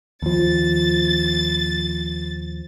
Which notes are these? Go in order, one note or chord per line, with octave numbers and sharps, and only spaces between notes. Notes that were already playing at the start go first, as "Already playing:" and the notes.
D#2 F3 A6